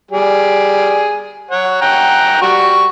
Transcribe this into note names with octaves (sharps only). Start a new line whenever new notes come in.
G3 G#4
C#5 F#5
F#5 G5 A#5
G3 F#4 C#6